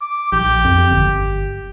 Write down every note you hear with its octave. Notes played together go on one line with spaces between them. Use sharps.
D6
A#1 G4
F2
G1